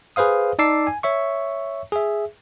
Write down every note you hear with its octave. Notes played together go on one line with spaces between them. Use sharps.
G#4 B4 C5 F5 D#6
D#4 D5 A5 D6 E6 C7
G#5
C#5 E5 C#6
G#4 E5